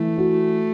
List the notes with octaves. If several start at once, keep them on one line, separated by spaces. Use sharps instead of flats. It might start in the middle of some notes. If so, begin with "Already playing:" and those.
Already playing: E3 A3
F#4